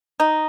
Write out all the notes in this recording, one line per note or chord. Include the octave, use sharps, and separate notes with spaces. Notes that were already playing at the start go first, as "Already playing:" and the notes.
D#4